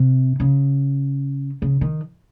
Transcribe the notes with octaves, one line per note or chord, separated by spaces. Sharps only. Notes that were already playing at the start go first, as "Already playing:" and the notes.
Already playing: C3
C#3
C#3
D#3